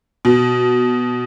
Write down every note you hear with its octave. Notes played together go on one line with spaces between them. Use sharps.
B2